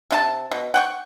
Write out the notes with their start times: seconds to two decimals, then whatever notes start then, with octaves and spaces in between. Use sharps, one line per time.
0.11 C3 F4 A5
0.51 B2
0.74 F#5 G5 C#6